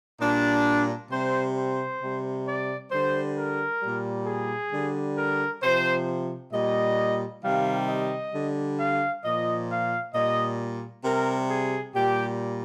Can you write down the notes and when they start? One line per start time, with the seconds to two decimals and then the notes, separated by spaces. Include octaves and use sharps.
0.20 A#2 G3 D4
1.11 C3 G3 C5
1.56 C5
2.01 C3 G3
2.46 D5
2.91 D3 G3 C5
3.36 A#4
3.81 A#2 G3
4.27 G#4
4.72 D3 G3
5.17 A#4
5.63 C3 F3 C5
6.53 A#2 G3 D#5
7.43 C3 D#3 G3 F5
7.88 D#5
8.33 D3 G3
8.78 F5
9.24 A#2 F3 D#5
9.69 F5
10.14 A#2 G3 D#5
11.04 C3 G3 A#4
11.50 G#4
11.94 A#2 G3 G4